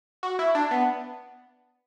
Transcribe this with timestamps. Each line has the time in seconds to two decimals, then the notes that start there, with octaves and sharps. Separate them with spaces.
0.23 F#4
0.39 E4
0.55 D4
0.71 B3